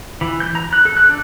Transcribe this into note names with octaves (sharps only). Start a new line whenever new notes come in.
E3
G6
A#5
F#6
A4
F#6
D4